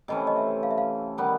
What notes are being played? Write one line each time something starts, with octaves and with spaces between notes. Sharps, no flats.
C3 E3 A3 C#4 D#5
D#5
E5
F5
E5
F5
D#3 G3 B3